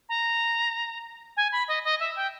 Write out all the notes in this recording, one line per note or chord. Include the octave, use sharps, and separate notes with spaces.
A#5
G#5
B5
D#5
D#5
E5
G5